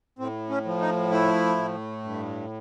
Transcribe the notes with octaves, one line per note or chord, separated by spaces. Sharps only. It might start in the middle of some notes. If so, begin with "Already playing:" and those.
A2 C4
C#4
F3
D#4
A3 E4
A2
G2